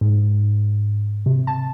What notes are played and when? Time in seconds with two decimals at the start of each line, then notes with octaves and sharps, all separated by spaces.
0.01 G#2
1.26 C3
1.47 A5